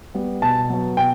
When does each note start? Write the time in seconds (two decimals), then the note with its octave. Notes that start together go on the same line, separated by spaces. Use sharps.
0.15 G3 B3
0.42 B2 A5
0.70 F#3 B3
0.97 B2 G5